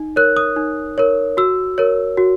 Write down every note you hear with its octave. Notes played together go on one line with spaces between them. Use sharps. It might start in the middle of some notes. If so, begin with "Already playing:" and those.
Already playing: D#4
A#4 C#5 F#6
D#6
D#4
A#4 C#5
F#4 E6
A#4 C#5
F#4